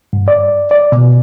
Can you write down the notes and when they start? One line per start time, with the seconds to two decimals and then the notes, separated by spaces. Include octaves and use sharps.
0.13 G2
0.28 D5
0.71 D5
0.92 B2